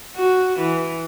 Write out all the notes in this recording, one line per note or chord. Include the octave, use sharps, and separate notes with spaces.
F#4
E3